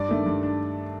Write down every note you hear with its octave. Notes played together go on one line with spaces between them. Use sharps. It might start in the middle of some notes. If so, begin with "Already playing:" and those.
Already playing: G2 D5 D6
D#3 A3 D4
G2
D4